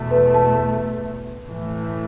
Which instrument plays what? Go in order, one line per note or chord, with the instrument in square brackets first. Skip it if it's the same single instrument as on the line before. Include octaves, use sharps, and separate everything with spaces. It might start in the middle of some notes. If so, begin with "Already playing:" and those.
Already playing: [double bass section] E2 B2 A3
[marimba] B4
A5
[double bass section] A2 E3 A3